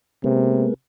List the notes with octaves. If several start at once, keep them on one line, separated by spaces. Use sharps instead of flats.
C3 G#3 A#3 B3